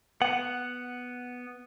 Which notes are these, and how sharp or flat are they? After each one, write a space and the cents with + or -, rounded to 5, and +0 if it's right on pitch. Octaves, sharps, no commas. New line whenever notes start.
B3 +0 F#5 +0